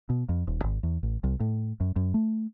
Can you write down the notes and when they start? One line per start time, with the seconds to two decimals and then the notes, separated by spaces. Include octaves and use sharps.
0.10 B2
0.29 F2
0.47 D#1
0.64 G#1
0.83 E2
1.03 A1
1.24 C2
1.40 A2
1.80 F#2
1.96 F#2
2.14 A3